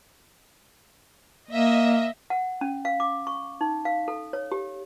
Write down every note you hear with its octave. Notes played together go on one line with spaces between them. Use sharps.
A#3 D#5 E5
F#5
C#4
F5
D6
C#6
D#4
F5
A4
C#5
G4